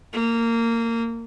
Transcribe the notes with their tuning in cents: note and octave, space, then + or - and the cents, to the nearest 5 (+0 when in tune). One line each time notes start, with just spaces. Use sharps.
A#3 -20